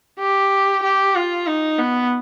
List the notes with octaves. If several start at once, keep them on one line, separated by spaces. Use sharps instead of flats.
G4
G4
F4
D#4
B3